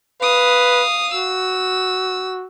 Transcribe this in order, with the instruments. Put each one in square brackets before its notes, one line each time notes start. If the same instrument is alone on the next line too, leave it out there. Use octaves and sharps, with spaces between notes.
[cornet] B4 [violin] F5 D#6
[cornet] F#4 [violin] E6